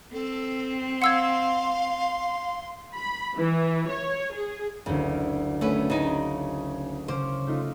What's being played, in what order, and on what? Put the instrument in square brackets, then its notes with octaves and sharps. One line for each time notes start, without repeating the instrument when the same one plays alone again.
[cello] C4 [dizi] A4
[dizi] F5 [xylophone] F#5 E6 G#6 [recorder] C6
[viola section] B5
E3
C#5
G#4
[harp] F#1 D2 [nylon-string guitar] C#3
[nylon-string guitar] A3 C#4 B4
C#3 D#4
[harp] C#3 C#4 D6 [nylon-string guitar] C5
[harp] A3 D#4 F4